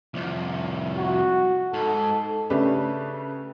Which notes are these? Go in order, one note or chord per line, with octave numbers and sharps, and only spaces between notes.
C2 F2
F#4
G#2 A4
C#3 A3 C#4 D4 G4 B4